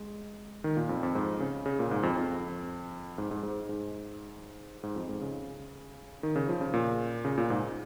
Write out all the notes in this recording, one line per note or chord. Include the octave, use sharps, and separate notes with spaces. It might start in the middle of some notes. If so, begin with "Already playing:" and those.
Already playing: G#3
D#3
A#2
F2
F2
G#2
C#3
C#3
A#2
G#2
F2
F2
G#2
G#2
G#2
G#2
G#2
F2
G#2
C#3
D#3
C#3
F3
C#3
A#2
C#3
A#2
G#2